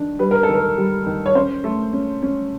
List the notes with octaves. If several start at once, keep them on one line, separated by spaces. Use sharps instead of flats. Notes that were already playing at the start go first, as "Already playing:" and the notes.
Already playing: D#3 D4
G3 B4
A#4
A4
D#3
A#4
G3
D#3
C#5
C#4 C5
A3
C#4
C#4